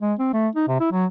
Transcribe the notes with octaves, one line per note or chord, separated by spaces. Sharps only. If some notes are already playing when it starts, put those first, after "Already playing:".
G#3
C4
A3
D#4
C3
E4
F#3